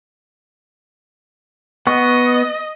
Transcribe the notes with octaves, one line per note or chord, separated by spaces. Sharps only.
B3 D#5 F#5 C#6